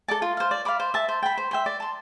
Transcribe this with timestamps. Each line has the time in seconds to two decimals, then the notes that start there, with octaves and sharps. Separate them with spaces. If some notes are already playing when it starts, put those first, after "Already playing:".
0.08 A4 D5 A5
0.22 F4
0.37 C5 F5
0.51 D5
0.65 F5 B5 D6
0.80 C5
0.94 E5 A5
1.09 C5
1.22 G5 B5
1.38 C5
1.51 E5 G5 C6
1.66 D5
1.80 A5 C6